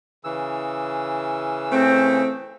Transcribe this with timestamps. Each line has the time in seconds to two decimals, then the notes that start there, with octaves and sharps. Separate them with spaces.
0.24 C#3 E3 E6
1.72 A3 C4